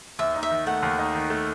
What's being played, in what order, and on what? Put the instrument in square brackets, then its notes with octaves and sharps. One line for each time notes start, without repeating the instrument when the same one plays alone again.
[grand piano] D#2 [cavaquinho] E5
[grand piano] D#4
[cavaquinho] E5
[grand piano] D#3
[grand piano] A3 [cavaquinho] F#5
[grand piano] D#2
D#4
D#3
A3